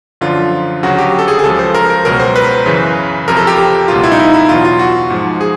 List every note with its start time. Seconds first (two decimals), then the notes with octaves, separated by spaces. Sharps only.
0.21 F#2 D3 F3 F4
0.83 D2 C#3 F#3 F#4
0.98 G4
1.19 A4
1.28 G#4
1.39 G#4
1.44 C#2 C#3 F3 A4
1.59 C5
1.75 A#4
1.90 A#4
2.05 C#2 B2 F#3 A#4
2.20 C5
2.36 B4
2.66 F#2 C#3 E3
3.28 F2 C3 F3 A#4
3.37 A4
3.47 G4
3.88 C#2 B2 F#3 F4
4.03 E4
4.12 D#4
4.19 E4
4.34 E4
4.49 E2 B2 F#3 F4
4.65 F4
4.79 F#4
5.10 G#2 F3
5.41 G#4